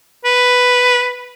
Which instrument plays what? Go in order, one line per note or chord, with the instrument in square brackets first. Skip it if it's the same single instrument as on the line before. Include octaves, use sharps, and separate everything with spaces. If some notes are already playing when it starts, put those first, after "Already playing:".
[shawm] B4